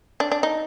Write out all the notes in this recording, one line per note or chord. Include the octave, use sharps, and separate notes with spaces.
D4
D4
D#4